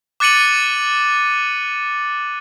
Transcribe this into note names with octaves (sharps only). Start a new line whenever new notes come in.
D6 F#6 A6 C#7 D#7 F#7